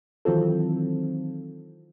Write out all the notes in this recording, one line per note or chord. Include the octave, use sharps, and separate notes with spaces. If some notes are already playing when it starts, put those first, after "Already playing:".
D#3 E3 F#3 C4 F4 A4